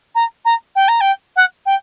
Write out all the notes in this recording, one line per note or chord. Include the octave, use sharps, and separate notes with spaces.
A#5
A#5
G5
A#5
G5
F#5
G5